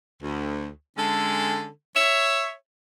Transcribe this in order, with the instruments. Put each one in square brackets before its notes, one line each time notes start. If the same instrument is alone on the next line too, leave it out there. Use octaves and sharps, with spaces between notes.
[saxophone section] D2
D3 G#3 C#4 A4
C#5 E5